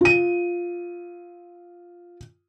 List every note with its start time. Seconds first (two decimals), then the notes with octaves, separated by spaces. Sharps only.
0.01 F4 D#7